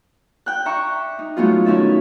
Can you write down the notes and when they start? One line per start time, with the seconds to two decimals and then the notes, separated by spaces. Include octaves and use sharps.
0.46 G5 F#6
0.66 E5 A#5 C#6 D6
1.19 D#4
1.37 F#3 G#3 A3 B3 F4
1.65 D#3 C#4 E4 E5 A5